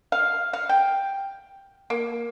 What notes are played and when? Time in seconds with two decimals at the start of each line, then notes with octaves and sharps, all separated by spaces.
0.12 F5
0.53 F5
0.69 G5
1.90 A#3